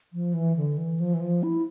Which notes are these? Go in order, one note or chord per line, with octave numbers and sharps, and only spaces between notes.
F3
E3
D3
E3
F3
E3
F3
E4